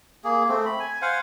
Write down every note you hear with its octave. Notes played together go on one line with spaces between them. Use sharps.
A#3 G#4
A3 C4
B5
G#5
C5 F5 F#5 G#5